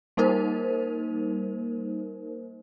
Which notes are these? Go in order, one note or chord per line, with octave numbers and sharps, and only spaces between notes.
G3 A#3 D#4 A#4 C5